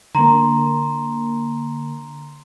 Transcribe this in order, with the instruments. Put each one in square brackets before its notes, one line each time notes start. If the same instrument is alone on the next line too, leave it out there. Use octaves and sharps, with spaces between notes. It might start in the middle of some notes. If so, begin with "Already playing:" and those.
[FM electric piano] D3 A#3 [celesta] A#5 C6